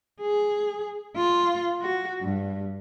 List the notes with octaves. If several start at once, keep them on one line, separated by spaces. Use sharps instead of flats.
G#4
F4
F#4
G2